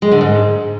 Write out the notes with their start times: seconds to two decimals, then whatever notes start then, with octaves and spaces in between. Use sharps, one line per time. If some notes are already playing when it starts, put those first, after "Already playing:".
0.02 G#3
0.11 D3
0.21 G#2